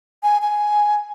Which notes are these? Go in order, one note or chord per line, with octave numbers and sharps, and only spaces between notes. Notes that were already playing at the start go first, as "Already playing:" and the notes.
G#5
G#5